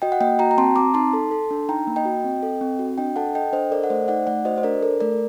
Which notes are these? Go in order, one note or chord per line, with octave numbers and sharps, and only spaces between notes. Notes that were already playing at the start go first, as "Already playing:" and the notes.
F#4 D#5 G5
F#5
A#3 D#5 G5
F#4 G5 A#5
A#5
C4 A5 C6
C4 A#5 D6
D#4 A5 C6
A4
A4
D4
D#4 G5 A#5
A#3
D#5 G5
F#4
C4
A4
C4
F#4
D4 D#5 G5
A4 F#5 A5
A4 D#5 G5
D4 C5 D#5
A4 A#4 D5
F#5
A3 C5 D#5
D#4 D5 F#5
A3 D5 F#5
F#4 C5 D#5
C5
D4 A#4 D5
A4 A#4
A3 A#4 D5